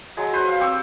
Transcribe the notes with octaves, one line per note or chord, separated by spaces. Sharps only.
F#3 G#3
F#4 B4 C5
F5
C4 G4 C#6 E6